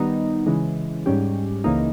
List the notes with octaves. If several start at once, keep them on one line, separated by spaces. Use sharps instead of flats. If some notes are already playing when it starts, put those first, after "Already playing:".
Already playing: D#3 G3 B3 D#4
C#3 E3 G#3
G#2 G3 C#4 G4
C#2 C#3 E3 A#3 D#4